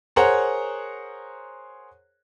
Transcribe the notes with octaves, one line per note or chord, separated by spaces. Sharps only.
G#4 A#4 C5 C#5 F#5 A#5